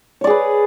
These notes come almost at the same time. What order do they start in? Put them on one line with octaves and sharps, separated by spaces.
C#5 D5 G#4 B4